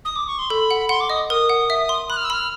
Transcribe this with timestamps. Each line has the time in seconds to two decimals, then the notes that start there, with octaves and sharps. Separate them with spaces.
0.05 D#6
0.16 D6
0.27 C#6
0.39 C6
0.50 A4 B5
0.71 F#5
0.89 F#5 C6
1.00 D6
1.10 D#5 D#6
1.30 A#4 D#6
1.49 F#5
1.70 E5
1.89 C6
2.10 B5 F#6
2.17 F6
2.25 E6
2.30 B5 F6